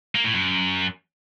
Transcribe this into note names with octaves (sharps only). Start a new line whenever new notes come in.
A#3
A2
F#2